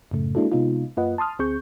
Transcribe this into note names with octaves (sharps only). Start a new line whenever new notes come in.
F#2 A2 C#3 A3
G#3 A#3 D4 E4 F#4 A4
C3 G#3 B3 D#4 F4
F#2 A#3 F4 B4 D#5 F#5
A5 C6 D#6 F6
D2 C4 G#4 C#6 G6